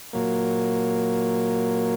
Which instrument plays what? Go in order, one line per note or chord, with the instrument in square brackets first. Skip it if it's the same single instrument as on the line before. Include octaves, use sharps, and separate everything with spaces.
[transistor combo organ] A#2 F#3 A#3